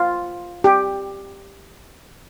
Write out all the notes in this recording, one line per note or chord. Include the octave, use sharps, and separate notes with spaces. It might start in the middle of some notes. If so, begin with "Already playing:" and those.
Already playing: F4
G4